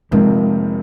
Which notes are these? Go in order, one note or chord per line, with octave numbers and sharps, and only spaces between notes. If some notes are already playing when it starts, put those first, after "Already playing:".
F1 F2 C3 D#3 G#3 A#3